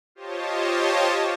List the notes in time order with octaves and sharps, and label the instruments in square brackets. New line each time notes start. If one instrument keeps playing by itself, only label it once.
[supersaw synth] F4 G4 C5 C#5 D#5 A5